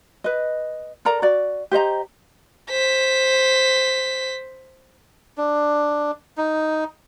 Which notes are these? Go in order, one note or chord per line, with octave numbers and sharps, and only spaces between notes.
B4 D#5
A4 A#4 D5 A#5
F#4 D5
G4 C5 D#5 A#5
C5 B6
D4
D#4